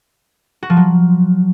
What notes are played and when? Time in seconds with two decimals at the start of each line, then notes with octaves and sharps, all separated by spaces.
0.63 F#4
0.70 F3
0.77 F#3